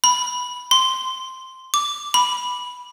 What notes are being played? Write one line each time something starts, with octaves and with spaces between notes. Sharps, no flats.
B5
C6
D6
B5